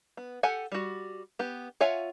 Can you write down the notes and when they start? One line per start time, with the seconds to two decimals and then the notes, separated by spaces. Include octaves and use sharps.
0.17 B3
0.43 G4 A4 F#5 G#5
0.72 G3 F#4
1.39 B3 G4
1.81 F4 C#5 E5 F#5 G#5